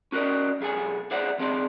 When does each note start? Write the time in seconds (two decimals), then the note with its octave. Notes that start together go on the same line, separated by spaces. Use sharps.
0.12 C#4 F#4 A#4 D5 D#5
0.61 B1 G#4 A4 G#5
1.11 G#4 C5 D5 E5 F#5
1.39 D#3 C4 G#4 D5 A5